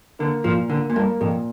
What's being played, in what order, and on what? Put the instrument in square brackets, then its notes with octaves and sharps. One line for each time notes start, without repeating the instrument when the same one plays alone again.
[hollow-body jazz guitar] D3 [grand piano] A#3
[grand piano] A#2 [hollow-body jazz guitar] F3
[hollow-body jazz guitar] D3 [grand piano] A#3
[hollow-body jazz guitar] A#2
[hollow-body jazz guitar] G2 [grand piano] A#3
[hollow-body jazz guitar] F2 [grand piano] A#2